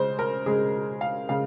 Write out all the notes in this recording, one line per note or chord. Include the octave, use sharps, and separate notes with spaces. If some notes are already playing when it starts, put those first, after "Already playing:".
Already playing: C#3 G#3 C5
A#4
C#3 G#3 G#4
F5
C#3 G#3 F5